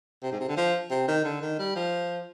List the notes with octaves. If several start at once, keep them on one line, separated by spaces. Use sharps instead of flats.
C3
G#2
C3
D3
F3
C3
D#3
D3
D#3
G3
F3